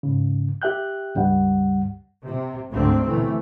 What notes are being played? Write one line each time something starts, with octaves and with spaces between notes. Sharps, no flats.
G#2 C#3
G4 E5 G5 F#6 G6
C#2 G2 G3 F#5
C3
D2 G#2 D3 A3 C4
B2 E3 A3